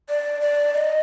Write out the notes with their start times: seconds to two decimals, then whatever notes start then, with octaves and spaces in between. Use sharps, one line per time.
0.09 D5
0.41 D5
0.75 D#5